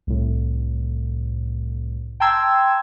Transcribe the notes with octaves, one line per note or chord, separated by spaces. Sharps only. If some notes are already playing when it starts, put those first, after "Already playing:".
C2 A2
G5 A5 A#5 C6 E6 G#6